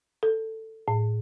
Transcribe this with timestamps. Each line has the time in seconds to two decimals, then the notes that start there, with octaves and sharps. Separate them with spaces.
0.23 A4
0.88 A2